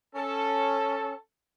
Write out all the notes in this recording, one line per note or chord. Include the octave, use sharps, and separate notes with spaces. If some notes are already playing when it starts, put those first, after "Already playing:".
C#4 A4